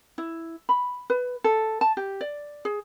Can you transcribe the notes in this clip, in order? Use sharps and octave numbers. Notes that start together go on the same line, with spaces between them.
E4
B5
B4
A4
A5
G4
D5
G#4